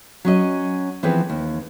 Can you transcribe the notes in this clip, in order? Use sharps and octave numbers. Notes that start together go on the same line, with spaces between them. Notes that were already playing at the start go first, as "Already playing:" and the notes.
F#3 C#4 D#5
E3 F3 B3 C4 G#4 B4
D#2